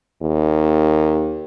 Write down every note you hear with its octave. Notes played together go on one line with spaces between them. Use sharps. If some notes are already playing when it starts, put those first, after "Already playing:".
D#2